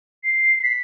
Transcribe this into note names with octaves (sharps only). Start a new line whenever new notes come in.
C7
C7
B6